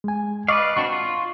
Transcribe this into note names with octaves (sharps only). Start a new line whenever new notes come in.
G#3 G#5
B4 D5 D#5 F5 C#6 D6
C4 D4 F#4 C#6
F4